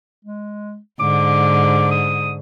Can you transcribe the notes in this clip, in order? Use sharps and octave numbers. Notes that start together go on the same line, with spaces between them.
G#3
G#2 D3 D6
D#6